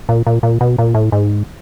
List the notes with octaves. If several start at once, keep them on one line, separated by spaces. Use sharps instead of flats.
A#2
A#2
A#2
B2
A#2
A2
G#2